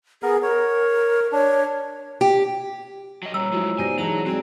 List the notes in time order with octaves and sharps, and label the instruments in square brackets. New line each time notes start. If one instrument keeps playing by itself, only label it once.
[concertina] B3 A#4 [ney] G#4
[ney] A#4 [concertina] C#5
[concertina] D4 [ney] C#5
[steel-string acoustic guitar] G4
[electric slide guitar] F#3 D#5
[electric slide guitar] A#2 G3 [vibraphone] C#5 A#5 [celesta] E6
[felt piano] F3 F#3 E4 [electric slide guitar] G#3 A3
[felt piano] B2 G4 A#6 [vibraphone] D#4 C5 D5 [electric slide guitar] G#5
[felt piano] E3 G#3 D#4 [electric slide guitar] F#3 [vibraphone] C#5 A5 A#5
[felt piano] F#3 G#3 [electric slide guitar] C4 [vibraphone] F#4 G#4 D5